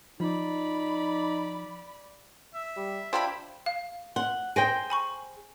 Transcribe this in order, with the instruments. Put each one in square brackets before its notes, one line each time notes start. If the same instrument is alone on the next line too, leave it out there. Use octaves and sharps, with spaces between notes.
[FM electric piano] F3 [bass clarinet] D#4 [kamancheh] D5 B5
[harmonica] E5
[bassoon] G3
[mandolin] D4 E4 B5 [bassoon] F4 [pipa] G4 C5
[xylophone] F5
[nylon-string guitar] F#5 [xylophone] C6
[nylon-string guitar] G#4 C5 G5 [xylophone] A#6 D7 D#7
[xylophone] G#5 B5 C#6